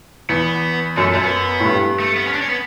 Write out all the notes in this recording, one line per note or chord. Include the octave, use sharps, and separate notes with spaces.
E2 B3
F#2 A3
F#2 A3
B3
A2
G2
A3
B3
C#4
D4
C#4
B3